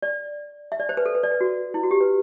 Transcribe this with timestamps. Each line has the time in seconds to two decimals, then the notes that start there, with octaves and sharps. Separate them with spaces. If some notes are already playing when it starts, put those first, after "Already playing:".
0.02 D5
0.72 E5
0.80 D5
0.89 C5
0.97 B4
1.06 A4
1.15 B4
1.23 D5
1.31 B4
1.41 F#4
1.74 E4
1.83 F#4
1.91 G4
2.01 B4